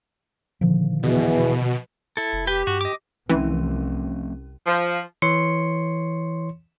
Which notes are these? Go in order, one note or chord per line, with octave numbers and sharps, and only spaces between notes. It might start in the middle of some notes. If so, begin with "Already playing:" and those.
A#2 D3 D#3 F3
E2 B2 E3
E4 A4
F1
G4 B4 G5
G2 F#4
D#5 D6
C2 E3 F3 A3 C4 C#4
F3
E3 C#5 C6 C#7